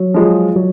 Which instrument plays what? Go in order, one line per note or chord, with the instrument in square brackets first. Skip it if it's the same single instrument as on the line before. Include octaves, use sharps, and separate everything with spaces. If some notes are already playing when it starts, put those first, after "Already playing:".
Already playing: [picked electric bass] F#3
[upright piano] F3 G#3
[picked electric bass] F#3